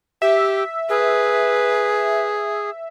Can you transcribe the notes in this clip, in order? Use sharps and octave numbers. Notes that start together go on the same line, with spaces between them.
G4 E5
G#4 B4